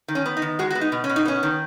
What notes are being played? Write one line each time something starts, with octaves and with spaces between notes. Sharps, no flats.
D#3
C#4
B3
D#4
D#3
G#3 F#4
B3 F#4
D#4
B2
C#4
B2
D#4
B3 C#4
D#3